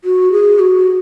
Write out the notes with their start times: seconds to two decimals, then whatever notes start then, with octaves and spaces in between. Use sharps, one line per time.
0.04 F#4
0.32 G#4
0.59 F#4